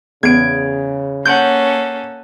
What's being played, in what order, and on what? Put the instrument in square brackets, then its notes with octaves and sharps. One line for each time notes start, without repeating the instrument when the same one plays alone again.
[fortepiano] E2 [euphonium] C#3 [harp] G#6 D7
[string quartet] A#3 C#4 A4 [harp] F#5 G6